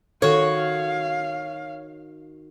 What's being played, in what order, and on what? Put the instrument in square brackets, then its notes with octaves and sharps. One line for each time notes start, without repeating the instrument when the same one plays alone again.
[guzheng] D#3 F#4 [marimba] A4 [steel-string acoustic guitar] C#5 [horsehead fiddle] F5